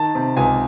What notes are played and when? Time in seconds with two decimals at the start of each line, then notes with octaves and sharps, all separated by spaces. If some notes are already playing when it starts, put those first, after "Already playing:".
Already playing: D#3 A5
0.15 C3
0.37 C#2 G#5